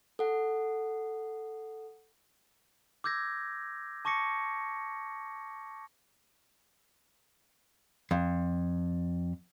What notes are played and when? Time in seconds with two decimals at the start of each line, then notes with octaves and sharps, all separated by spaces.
0.19 A4 F#5
3.04 D6 E6 G6 G#6 A#6
4.05 A5 C#6 D6 A#6 C#7
8.11 F2